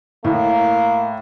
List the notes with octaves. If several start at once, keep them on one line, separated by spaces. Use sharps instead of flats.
A2 A#3